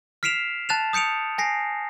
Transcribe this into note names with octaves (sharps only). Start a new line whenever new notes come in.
F6 B6 C7 D7 E7 F7
A5 F#6 A6 E7 F7
D#6 G6 C#7 D7 F7
G#5 A#6 C7